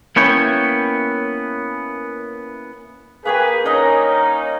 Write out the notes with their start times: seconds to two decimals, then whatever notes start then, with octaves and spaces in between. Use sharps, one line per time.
0.16 A#3 B3 C#4 E4 C#5 G5
3.25 A#3 G#4 B4 C#5 G5
3.65 C#4 D#4 A#4 D#5 A#5